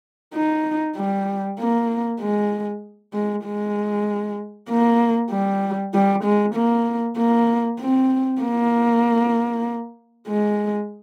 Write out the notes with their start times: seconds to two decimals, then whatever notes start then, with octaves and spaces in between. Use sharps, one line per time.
0.34 D#4
0.96 G3
1.59 A#3
2.20 G#3
3.14 G#3
3.45 G#3
4.69 A#3
5.31 G3
5.94 G3
6.24 G#3
6.55 A#3
7.17 A#3
7.79 C4
8.41 A#3
10.28 G#3